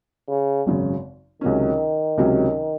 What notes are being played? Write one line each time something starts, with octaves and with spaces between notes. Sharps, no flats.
C#3
G#1 F#2 C#3
C#2 C3 D#3 F#3 C#4
C#2 C3 F#3 C#4